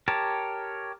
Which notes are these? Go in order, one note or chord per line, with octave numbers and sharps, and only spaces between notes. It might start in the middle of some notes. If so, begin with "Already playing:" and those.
G4 A#4 C#5 A5